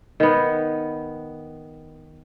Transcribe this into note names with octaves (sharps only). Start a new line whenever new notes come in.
D#3 B3